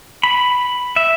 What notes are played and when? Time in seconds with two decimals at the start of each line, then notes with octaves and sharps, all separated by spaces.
0.23 B5
0.96 E5